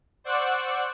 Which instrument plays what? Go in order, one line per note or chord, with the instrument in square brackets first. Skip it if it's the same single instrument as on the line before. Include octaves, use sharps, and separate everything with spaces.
[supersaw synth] C5 D5 F#5 C#6 E6 F#6